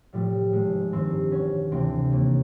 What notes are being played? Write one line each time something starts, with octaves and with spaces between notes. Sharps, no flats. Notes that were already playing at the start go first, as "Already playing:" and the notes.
A2 F3 G3
G#1 G#3
G2 D#3 C4
E1 C#4
D2 C3 E3 C4
D#2 A#3